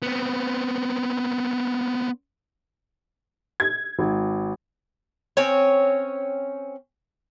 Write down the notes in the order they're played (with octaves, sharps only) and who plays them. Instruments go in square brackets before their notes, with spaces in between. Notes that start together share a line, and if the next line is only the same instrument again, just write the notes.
[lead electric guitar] B3 C4
[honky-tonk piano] G#6
G#1
[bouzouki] C4 C#4 C#5